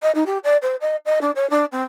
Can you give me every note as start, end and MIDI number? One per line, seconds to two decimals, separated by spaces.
0.02 0.11 75
0.15 0.23 63
0.26 0.38 67
0.44 0.57 74
0.62 0.76 72
0.81 0.96 75
1.05 1.19 75
1.21 1.31 62
1.35 1.49 73
1.50 1.65 62
1.72 1.83 60